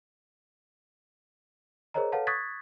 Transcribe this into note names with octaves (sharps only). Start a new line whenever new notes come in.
G#4 A#4 C5 C#5 D#5 A#5
A4 B4 C#5 F5 F#5 A5
C#6 D#6 F#6 G#6 A6 B6